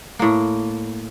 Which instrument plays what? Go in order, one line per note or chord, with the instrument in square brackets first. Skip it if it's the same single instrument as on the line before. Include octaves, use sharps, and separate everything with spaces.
[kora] A2 A#3